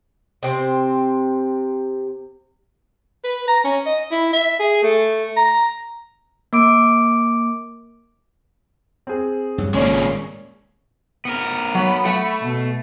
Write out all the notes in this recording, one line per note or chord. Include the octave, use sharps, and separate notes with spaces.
C3 C4
B4
A#5
C#4
D#5
E4
E5
G#4
A3
A#5
A#3 D6 D7
C4 G#4
G2 F#3
G#1 A#2 C#3 G#3 A#3 C#4 D5
B3 A#4
F#3 B5
A3 F#5 B5 C#6
B2